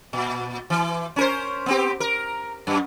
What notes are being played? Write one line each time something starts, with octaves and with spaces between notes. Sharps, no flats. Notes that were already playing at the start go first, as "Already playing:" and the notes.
A#2
E3
C#4 A#4 C5
B3 C4 G4
A#4
F#2